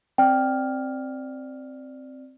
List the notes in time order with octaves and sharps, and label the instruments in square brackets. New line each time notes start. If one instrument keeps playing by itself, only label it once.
[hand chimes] C4 D5 F6 [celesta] G5